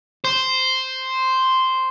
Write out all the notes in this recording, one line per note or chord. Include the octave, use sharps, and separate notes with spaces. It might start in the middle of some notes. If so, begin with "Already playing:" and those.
C5